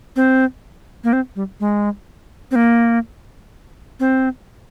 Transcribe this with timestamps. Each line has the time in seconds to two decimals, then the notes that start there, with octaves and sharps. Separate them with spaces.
0.16 C4
1.04 A#3
1.13 C4
1.36 G3
1.60 G#3
2.51 C4
2.56 A#3
4.00 C4